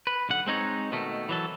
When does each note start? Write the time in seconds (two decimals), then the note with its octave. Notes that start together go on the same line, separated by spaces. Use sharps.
0.07 B4
0.29 B1 D3 F#5
0.47 G#3 C4 D#4 C#5
0.92 B2 D#3 A3
1.29 E3 F#3 A4